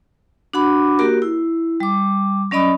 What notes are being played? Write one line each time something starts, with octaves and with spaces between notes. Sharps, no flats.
D4 F#4 F#5 B5 D6
A#3 F#4 G4 A#4
E4
G3 D6
F#3 C#4 D5 D#5 B5 D#6